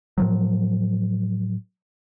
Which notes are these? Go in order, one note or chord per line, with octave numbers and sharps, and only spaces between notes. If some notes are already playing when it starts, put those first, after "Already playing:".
A2 F3 F#3